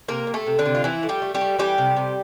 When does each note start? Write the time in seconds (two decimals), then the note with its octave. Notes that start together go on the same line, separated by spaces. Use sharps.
0.08 C3 A#3 A#4
0.27 C3
0.34 A3 A4
0.46 C3
0.59 D3 D4
0.66 C3
0.75 F4
0.84 E3 F3 E4
1.03 A3
1.09 G3 G4
1.22 A3
1.35 G3 G4
1.41 A3
1.58 E3 G3 G4
1.78 C3
1.96 C3